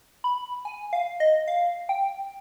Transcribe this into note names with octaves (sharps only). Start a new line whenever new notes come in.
B5
G#5
F5
D#5
F5
G5